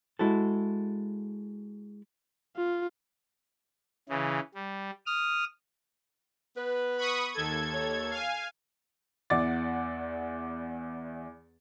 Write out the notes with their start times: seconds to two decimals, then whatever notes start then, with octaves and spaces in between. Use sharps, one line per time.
0.19 G#3 E4 F#4 A4
2.56 F4
4.09 C#3 E3
4.54 G3
5.06 D#6 F6
6.57 B3 B4
6.97 B5 C#6 D#6
7.32 D#2 A4 G#6
7.73 C#5
8.11 F5 G#5
9.30 E2 E4 D5 F#5 D6 A6